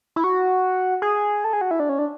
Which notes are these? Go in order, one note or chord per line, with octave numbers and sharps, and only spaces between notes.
E4
F#4
G#4
A4
G#4
F#4
E4
D4
C#4
D4